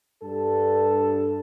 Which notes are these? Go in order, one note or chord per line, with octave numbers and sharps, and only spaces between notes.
G2 A4